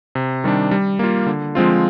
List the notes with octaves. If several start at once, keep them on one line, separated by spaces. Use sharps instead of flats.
C3
D#3 G3 D4
G3
A#3 F4
D3
F3 G#3 C4 F4